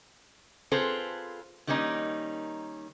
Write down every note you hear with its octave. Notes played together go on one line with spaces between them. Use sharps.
C4 F4 G#4 A4 B4 C5
D#3 G3 A#3 C#4 D#4